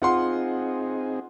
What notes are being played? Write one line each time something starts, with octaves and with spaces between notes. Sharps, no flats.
C4 D#4 F4 G#4 F#5 C6